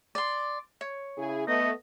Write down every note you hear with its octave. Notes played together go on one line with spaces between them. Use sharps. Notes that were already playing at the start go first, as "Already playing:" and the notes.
D5 C6
C#5
C#3 E4 G#4
A3 B3 D#5